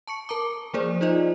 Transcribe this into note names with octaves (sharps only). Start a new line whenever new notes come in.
A5 C#6 C#7
A#4 A5 A#5 D6
F3 A#3 G#4 A#4 C5 D5
D#4 F4 C5 D5 D#5